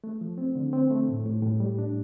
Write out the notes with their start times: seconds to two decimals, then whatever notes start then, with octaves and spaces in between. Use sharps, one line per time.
0.04 A3
0.21 F3
0.38 C4
0.55 D3
0.73 C4
0.91 A3
1.08 A2
1.26 A2
1.43 A2
1.60 G3
1.78 D4